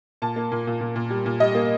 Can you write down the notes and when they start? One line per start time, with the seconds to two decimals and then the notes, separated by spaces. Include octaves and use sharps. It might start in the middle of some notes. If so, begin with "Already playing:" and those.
0.22 A#2 A5
0.36 A#3
0.52 A#2
0.67 A#2
0.81 A#2
0.96 A#2
1.10 G3
1.26 A#2
1.40 G3 D#5
1.55 A#3